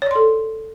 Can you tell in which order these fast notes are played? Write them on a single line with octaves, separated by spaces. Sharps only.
C#5 D5 C6 A4